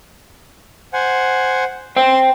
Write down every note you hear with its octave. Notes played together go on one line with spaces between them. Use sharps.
C5 F#5 G#5
C5 G5 C6